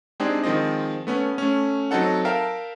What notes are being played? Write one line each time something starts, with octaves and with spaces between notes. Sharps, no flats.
G#3 C4 D4 D#4 G4 G#4
D#3 F3 G#3 C4 D#5
A3 B3 C#4
A3 C#4
F#3 C4 D#4 A4 F#5
A#4 E5 F5 G5 A5